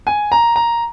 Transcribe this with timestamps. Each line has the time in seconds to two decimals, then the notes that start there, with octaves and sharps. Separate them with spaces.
0.07 G#5
0.32 A#5
0.56 A#5